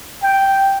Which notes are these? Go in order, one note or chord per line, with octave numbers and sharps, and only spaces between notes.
G5